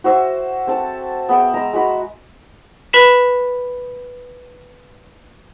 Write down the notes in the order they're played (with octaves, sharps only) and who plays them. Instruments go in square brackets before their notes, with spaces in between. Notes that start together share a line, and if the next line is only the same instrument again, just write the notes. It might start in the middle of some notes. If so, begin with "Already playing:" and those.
[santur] F#4 C5 E5
C4 A4 A5
B3 G#4 E5 G5
G#3 A#5 E6
G#3 F#4 B5
[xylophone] B4 B5 B6 E7